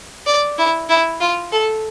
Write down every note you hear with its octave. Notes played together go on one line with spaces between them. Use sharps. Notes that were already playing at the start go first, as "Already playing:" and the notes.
D5
E4
E4
F4
A4